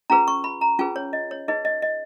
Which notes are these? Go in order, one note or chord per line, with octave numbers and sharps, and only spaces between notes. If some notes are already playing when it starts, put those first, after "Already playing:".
C#4 F4 G#4 B4 A#5
C#6
B5
A#5
C#4 F4 G#4 B4 G#5
C#5
D#5
C#5
D#4 G#4 B4 D#5
D#5
D#5